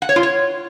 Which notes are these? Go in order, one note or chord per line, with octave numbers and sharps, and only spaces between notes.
F#5
C#5
F4
C#5